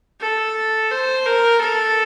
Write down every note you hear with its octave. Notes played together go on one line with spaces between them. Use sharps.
A4
C5
A#4
A4